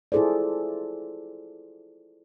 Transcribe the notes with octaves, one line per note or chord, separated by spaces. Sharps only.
E4 F4 G#4 A4 C5 D5